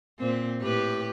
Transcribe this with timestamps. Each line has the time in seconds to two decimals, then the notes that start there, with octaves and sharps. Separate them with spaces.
0.19 A#2 C4
0.60 A2 G4 B4